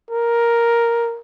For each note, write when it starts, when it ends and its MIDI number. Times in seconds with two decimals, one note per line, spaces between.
0.11 1.20 70